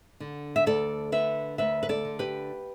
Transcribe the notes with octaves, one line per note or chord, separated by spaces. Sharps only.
D3
E5
D2 A4 D5
D3 B4 E5
D2 B4 E5
B4
A4 D5
D3
G4 B4